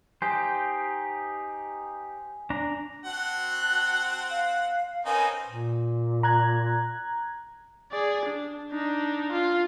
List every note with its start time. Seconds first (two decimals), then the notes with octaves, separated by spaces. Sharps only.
0.22 D#4 G4 C5 G#5
2.50 D4 A#5
3.05 C4 F#4 F#5 A5 F#6
4.28 F5
5.05 C4 C#4 D#4 A#4 B4 G#5
5.46 A#2
6.23 A#5 F#6 G#6
7.91 G#4 D5
8.25 D4
8.72 D4 D#4
9.32 F4